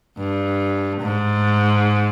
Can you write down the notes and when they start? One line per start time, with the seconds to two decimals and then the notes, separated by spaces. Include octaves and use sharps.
0.18 G2
1.01 G#2